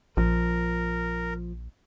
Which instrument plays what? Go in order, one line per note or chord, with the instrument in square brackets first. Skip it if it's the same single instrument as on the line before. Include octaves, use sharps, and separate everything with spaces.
[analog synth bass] A#1 [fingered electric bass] F3 [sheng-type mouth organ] A#4